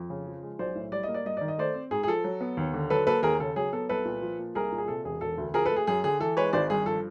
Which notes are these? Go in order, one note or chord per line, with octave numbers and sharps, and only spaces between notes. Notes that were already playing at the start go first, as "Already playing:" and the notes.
Already playing: F2
C#3
F3
G#3
B1 C5 D5
A2
G3 D5
A#3 D#5
D5
G2 D#5
D#3 D5
D#5
A3 C5 D5
C4
G#2 G#4
G#4
F3 A4
F#3
B3
D#2
D3
F#3 A4 B4
A#3 A4 B4
D#2 G#4 A#4
C#3 A4
F#3 G#4
B3 A4
C2 A4 B4
A#2
F3
A#3
C2 G#4 A#4
A#2
G#4
C3 A4
E1 G#4
E1 A4
D2
F3 G#4 A#4
A4 B4
A3
G#4
F#2 G#4
D3 G#4
E3 A4
G#3 B4 C#5
G#1 C5 D5
G2 G#4
F3 A4